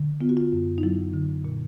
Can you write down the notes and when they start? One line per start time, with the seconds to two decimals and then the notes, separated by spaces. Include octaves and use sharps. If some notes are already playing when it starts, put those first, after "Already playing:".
Already playing: D3
0.21 B3 F4
0.29 F#4
0.37 F4
0.53 F#2
0.78 D#4
0.83 F#3 E4
1.14 D3
1.45 A#2